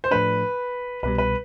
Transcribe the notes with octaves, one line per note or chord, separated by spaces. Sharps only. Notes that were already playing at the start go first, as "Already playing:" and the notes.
C5
A2 F3 A3 D4 B4
C2 B2 G3 B4
B4